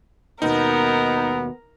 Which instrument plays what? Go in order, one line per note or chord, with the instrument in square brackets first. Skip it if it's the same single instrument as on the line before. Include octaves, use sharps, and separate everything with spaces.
[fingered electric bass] D#2 B2 [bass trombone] B3 [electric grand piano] D#4 [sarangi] A#4